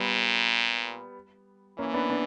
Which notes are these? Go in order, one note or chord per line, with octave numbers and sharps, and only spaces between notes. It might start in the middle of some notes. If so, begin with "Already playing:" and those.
Already playing: A#2 G3 B3
E3 A#3 C#4
B3 D4
B3 D4